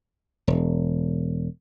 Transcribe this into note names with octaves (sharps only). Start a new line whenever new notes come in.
E1